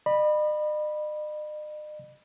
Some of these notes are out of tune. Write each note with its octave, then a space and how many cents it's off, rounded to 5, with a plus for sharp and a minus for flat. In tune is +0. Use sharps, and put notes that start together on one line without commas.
D#5 -45 B5 -10